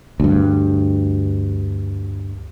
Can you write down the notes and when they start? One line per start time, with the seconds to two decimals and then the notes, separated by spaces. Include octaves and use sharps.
0.20 D2 G2